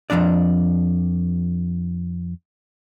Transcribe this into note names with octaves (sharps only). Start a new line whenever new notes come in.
F2 C#3 F3 D4 D5